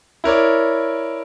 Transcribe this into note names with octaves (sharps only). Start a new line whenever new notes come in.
E4 A#4 C#5 D5